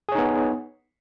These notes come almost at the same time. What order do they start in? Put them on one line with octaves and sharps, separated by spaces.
G#4 C#5 D#4 B3